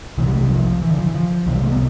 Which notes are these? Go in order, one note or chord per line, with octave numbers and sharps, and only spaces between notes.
C2 C3 E3
G3
A3
G3
F3
E3
D3
F3
E3
F3
C2 C3 E3 G3
A3
B3